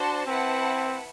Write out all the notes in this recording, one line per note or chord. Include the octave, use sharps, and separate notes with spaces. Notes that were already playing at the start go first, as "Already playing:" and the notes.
Already playing: D4 F#4 C5 A5
C4 E4 B4 F#5 A5